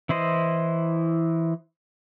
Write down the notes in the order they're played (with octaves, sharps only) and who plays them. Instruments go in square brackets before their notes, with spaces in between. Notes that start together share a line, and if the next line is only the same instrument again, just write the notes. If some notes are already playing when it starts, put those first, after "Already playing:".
[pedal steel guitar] E3 E4 C5 D#5